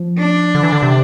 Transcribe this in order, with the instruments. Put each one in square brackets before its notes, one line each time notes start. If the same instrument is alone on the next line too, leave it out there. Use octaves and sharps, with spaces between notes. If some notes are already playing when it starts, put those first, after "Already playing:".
Already playing: [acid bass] F3
[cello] D4
[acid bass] D3
E3
D3
C3